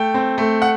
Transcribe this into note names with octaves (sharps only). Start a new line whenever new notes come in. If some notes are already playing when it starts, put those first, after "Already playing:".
Already playing: A3 G5
C4
A3
F#5